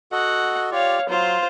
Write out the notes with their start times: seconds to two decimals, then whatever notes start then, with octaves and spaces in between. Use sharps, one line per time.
0.12 F#4 A4 D#5 F#5
0.71 F4 G4 C#5 D5 F5
1.09 F#3 F4 C5